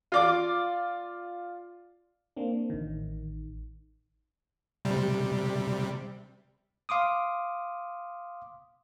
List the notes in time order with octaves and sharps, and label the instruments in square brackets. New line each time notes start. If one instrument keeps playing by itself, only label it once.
[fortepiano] F4 D5 D6
[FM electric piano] A#3 C4 D4
A1 D#3
[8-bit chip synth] C3 G3
[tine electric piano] F5 C6 D6 D#6